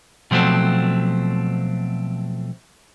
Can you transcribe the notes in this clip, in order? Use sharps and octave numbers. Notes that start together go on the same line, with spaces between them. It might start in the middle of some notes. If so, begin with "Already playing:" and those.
B2 F3 F#3 A3 C4